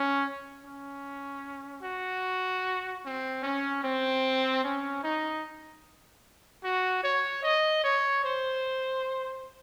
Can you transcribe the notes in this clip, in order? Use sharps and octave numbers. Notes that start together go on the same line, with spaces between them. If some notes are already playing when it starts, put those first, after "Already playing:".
Already playing: C#4
C#4
F#4
C4
C#4
C4
C#4
D#4
F#4
C#5
D#5
C#5
C5